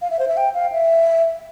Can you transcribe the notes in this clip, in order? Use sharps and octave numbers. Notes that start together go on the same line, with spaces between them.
F5
E5
C5
E5
G5
F5
E5